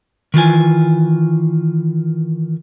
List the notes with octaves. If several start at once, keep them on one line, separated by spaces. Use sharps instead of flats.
D#3 E3 F4 G#5